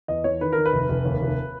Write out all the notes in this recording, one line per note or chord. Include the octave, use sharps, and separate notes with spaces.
E2 D#5
E3 C#5
D#3 B4
D#3 A#4
B4
F1
F1
D#2
F1